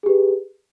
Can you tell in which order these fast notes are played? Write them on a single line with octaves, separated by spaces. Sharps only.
G#4 G4 B4